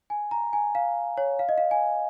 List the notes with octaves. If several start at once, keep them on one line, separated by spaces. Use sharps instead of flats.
G#5
A#5
G#5
F5
C#5
F5
D#5
F5
G#5